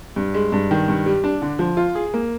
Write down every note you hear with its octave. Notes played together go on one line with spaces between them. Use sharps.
G2
G#3
G2
D#3
G2
G3
D4
D3
F3
F4
G#4
A#3